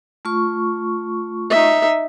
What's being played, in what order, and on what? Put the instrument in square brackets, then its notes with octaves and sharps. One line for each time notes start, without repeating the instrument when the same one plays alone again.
[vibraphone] A3 F4 C#6
[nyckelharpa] D#4 E5